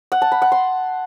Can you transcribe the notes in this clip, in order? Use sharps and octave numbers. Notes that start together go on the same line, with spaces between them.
F#5
A5
B5
F#5
C6